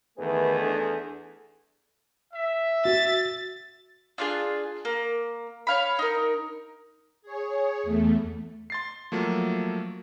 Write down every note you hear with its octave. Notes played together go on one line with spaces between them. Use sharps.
E2 D#3 A3 G#4 B4
D4 E4 A4
E5
F#4 A6
D4 F4 G4 G#4
A#3
C#5 F5 B5
D#4 A#4
G#4 C#5
E2 A3
C6 A6 C7
F3 F#3 A3 A#3